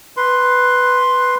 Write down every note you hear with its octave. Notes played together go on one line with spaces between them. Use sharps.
B4 C6